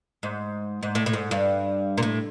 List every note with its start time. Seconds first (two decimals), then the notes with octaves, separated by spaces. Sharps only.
0.23 G#2
0.83 G#2
0.95 A2
1.06 A2
1.13 G#2
1.31 G2
1.98 A#2
2.03 A2